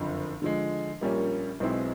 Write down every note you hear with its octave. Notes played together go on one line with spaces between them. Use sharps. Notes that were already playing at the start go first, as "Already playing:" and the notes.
Already playing: F#1 F2 D3
D3 F3 G#3
A#1 A#2 G3 A#3 C#4
B1 B2 G#3 C4 E4